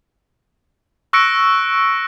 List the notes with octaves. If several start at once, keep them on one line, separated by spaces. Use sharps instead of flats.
C#6 E6 F#6 A#6 C#7 D7